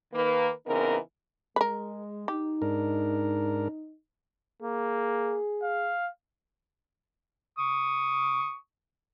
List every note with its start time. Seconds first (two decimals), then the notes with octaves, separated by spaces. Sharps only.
0.14 D#3 A#3 B4
0.67 C#3 E3 B3 C4 D#4 A#4
1.56 G#3 A#4 B4
2.28 D#4 G4
2.62 G#2 D4 A#4
4.63 A#3 G#4
5.63 F5
7.59 C#6 D#6